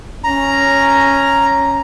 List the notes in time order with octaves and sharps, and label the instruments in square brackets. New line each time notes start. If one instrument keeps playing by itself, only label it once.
[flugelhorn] C#4 [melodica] A#5